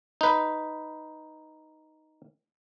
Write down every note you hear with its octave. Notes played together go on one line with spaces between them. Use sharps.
D#4 B4